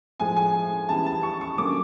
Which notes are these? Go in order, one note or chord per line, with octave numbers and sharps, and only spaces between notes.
A2 F3 G#3 G#5
G#5
C#3 E3 G3 B3 A5
A5
C#6
C#6
D3 F#3 A#3 C#4 D6